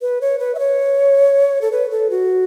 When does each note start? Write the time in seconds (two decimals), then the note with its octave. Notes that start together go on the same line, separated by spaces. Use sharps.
0.02 B4
0.21 C#5
0.39 B4
0.55 E5
0.59 C#5
1.62 A4
1.72 B4
1.91 A4
2.10 F#4